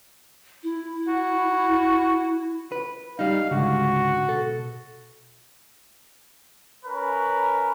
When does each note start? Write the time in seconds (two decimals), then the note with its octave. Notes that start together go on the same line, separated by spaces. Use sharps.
0.63 E4
1.08 F#4
2.72 B4
3.19 G3 D#4 F5
3.51 C#2 G#2 D3 F#4
4.29 B2 A4
6.86 C#4 A#4 B4